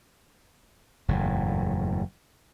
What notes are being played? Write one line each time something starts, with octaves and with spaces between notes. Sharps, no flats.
F#1 E2 A2